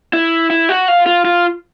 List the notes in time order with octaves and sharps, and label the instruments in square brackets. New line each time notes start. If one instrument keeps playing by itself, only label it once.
[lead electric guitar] E4
E4
F#4
F4
F4
F4